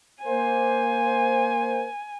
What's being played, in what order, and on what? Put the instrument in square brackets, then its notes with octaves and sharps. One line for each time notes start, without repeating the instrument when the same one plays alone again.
[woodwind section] A#3 C5 [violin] G#5